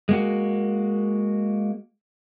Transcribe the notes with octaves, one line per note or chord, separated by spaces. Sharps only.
G#3 A#3 F#4